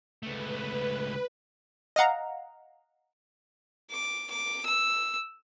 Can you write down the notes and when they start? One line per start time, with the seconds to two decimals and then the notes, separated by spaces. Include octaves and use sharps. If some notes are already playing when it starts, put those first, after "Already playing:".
0.23 C#2 A3 B4
1.96 D#5 F5 F#5 A#5
3.91 D6
4.30 D6
4.66 E6